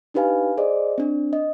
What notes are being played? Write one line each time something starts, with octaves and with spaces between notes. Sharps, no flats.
D4 D#4 G4 B4 F5 G#5
G#4 C5 D5 D#5
C4 D4
D#5